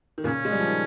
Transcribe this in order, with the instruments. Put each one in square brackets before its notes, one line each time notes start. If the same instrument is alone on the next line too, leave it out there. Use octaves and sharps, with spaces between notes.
[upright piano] D#3
[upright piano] A#2 C#3 [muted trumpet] C#4
[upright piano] G#3
G3
F3
D#3